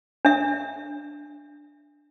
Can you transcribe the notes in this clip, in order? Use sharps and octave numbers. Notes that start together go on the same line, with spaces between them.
D4 E5